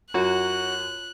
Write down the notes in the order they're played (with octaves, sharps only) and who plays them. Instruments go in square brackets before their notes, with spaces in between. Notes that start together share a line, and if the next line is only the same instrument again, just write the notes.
[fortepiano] F#2 [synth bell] F4 C#5 [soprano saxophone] F#4 [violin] F#6